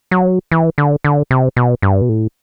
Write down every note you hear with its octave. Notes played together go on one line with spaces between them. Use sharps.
F#3
E3
D3
D3
C3
B2
G2
B2
A2